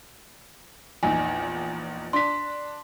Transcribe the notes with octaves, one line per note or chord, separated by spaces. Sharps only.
A#1 E2 D#4 G#5
D4 C6 B6